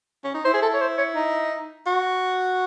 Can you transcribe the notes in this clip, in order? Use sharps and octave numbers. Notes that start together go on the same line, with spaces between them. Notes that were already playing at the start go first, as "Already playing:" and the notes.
C#4
D#4
E4 C5
G#4
A4
C#5
C5
C#5
D#4
F#4